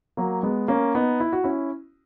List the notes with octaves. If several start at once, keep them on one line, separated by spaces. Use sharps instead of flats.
F#3 A#3
G#3 B3
A#3 C#4
B3 D#4
E4
F#4
C#4 E4